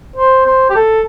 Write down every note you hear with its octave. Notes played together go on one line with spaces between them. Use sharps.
C5
C5
G4
A4